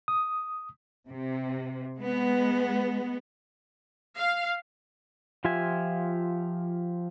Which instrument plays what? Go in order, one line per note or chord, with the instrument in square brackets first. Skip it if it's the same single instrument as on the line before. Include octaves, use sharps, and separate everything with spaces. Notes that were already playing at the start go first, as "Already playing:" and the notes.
[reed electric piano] D#6
[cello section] C3
G#3 B3
[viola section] F5
[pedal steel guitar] F3 F4 G4 E5 G#5